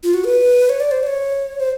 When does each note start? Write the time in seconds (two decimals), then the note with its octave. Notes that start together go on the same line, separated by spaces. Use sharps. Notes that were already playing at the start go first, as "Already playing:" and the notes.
0.04 F4
0.14 F#4
0.25 B4
0.69 C#5
0.80 D5
0.91 C5
1.03 D5
1.07 C#5
1.60 C5